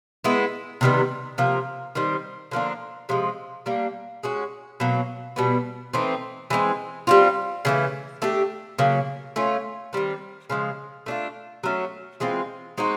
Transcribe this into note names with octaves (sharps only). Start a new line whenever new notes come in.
G#3 B3 E4
C3 D#3 G3 B3
C3 F3 A#3
D#3 G3 C4
D3 F3 A#3 D4
C3 F3 G#3
G3 A#3 D4
G#3 C#4 F#4
B2 F#3 A#3
B2 G3 B3
E3 A3 C4 D#4
E3 G#3 C4
G3 C4 F4
C#3 E3 A3
A3 D4 G4
C#3 F#3 A#3
A3 C#4 F4
D#3 G3 C4
C#3 F3 G#3
A3 D4 F4
F#3 A3 C#4
E3 G#3 C4 F4
G#3 C4 D#4 F#4